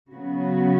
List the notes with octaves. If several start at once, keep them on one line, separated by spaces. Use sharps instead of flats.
C#3 F#3 B3 F#4